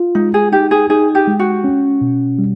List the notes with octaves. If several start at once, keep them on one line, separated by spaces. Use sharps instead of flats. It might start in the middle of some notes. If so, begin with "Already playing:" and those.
Already playing: F4
G#3 D#4
G#4
D#4 G4
G#4
D#4 G#4
G4
G#3
F#4
C#4
B2
G3